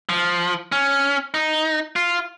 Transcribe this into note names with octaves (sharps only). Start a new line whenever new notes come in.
F3
C#4
D#4
F4